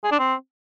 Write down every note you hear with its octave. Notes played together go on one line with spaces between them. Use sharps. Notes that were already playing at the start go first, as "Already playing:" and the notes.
G#4
D4
C4